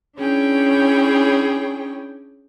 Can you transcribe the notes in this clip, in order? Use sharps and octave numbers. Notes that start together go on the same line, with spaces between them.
C#4 D4 E4 G#4 C#5 G5